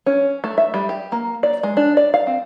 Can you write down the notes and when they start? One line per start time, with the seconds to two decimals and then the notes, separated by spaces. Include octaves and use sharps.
0.06 C#4
0.44 A3
0.58 E5
0.74 G3
0.89 G4
1.12 A#3
1.43 D5
1.63 G#3
1.77 D4
1.97 D5
2.14 F5
2.27 C4